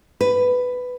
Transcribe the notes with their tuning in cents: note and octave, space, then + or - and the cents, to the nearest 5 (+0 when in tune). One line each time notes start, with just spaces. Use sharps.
B4 +10